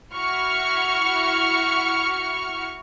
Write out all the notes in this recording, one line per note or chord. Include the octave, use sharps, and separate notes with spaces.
E4 F#4 C#6 F6 C#7